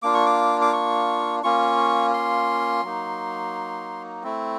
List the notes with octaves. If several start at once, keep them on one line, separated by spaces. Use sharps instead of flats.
A#3 D4 F4 D6
C#6
D6
D6
C#6
A#3 C#4 F4 C#6
C6
F#3 A#3 D#4
A3 C4 E4